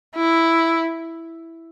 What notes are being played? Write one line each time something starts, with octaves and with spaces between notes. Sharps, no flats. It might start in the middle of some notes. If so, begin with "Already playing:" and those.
E4